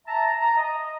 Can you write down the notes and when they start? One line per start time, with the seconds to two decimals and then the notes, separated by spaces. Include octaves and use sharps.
0.07 E5 A5 A#5
0.41 A#5
0.57 D#5